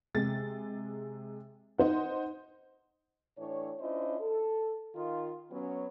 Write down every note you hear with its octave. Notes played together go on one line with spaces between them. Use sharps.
C3 G#3 A6
D#4 C5 F#5
A2 E3 D4 C#5
C#4 D4 E4 F4 C5 D#5
A4
D#3 F4
F#3 B3 C#4